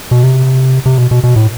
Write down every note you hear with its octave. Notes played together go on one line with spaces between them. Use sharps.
B2
C3
C3
B2
B2
B2
A2